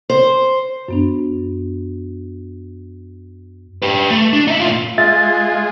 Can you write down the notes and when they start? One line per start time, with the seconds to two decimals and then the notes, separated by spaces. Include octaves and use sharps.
0.10 C5
0.88 F#2 B3 D4
3.82 G4 B4
4.10 A3
4.33 D4
4.48 D#4 E5
4.60 A2 F4
4.98 G#3 F4 E5 A6